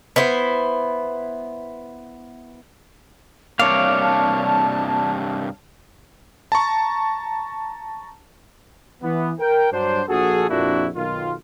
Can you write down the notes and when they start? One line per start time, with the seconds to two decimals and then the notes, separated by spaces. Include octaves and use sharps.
0.16 B3 E4 C5
3.59 G2 C3 A#3 D4 C#5 F5 A5
6.52 A5 A#5 C#6
9.02 E3 B3
9.39 A#4 G5
9.72 G2 F#3 D4 C5
10.09 A#1 F#4 G#4 A4
10.50 A#1 F2 A#3 D4 E4 F#4
10.95 B1 D#3 F4